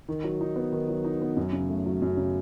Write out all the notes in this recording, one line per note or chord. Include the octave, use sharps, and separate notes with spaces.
D#3
F#3
D#4
B3
D#3
F#3
D#4
B3
F#2
C#3
A3
F#3
F#2
C#3